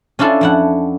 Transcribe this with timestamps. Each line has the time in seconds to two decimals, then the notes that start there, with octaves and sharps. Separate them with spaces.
0.19 C#4 D4 E4 F4 A4
0.41 F2 E4 F#5